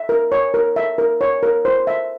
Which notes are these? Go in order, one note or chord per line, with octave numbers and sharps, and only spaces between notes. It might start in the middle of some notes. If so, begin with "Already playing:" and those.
Already playing: E5
A#4
C#5
A#4
E5
A#4
C#5
A#4
C5
E5